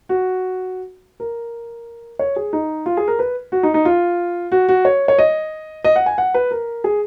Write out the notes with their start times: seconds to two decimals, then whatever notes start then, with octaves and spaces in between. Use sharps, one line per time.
0.09 F#4
1.20 A#4
2.19 C#5
2.36 G#4
2.53 D#4
2.86 F4
2.97 G#4
3.08 A#4
3.19 B4
3.52 F#4
3.63 D#4
3.74 D#4
3.85 F4
4.52 F#4
4.69 F#4
4.85 C#5
5.08 C#5
5.19 D#5
5.85 D#5
5.96 F#5
6.06 G#5
6.18 F#5
6.34 B4
6.51 A#4
6.84 G#4